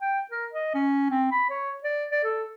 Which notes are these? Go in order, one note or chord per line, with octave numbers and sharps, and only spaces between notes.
G5
A#4
D#5
C#4
C4
B5
C#5
D5
D5
A4